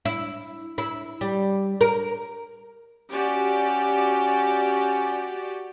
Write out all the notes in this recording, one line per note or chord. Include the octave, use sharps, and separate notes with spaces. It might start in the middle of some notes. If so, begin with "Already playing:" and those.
E4
E4
G3
A#4
C#4 F#4 G4 D5